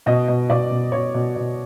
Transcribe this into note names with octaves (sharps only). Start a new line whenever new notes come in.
B2 D#5
B2
B2 D5
B2
B2 C#5
B2
B2